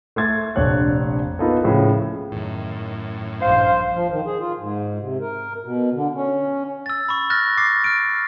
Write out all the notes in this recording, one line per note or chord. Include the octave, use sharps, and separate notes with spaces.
A3 C6 G#6 A6
F1 A#1 D4 C#5 F#6
A#3 B3 D#4 F4 A4
A2 C#3 F3 G#4
F#2 A2 D#3
A#1 G2 C5 F5
F3
D#3
G#4
F4
G#2
C3
A#4
B2
D3
C#4
E6 A6
B5 C#6
F6 F#6 A6 A#6
D6 A6 C7
F6 D7